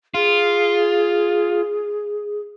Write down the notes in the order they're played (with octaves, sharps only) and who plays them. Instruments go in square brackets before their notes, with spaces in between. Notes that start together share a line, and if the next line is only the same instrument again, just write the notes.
[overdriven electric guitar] F4 [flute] G#4